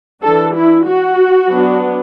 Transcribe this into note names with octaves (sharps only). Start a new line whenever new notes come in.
E3 D4 A4
E4
F#4
F#3 B3 D4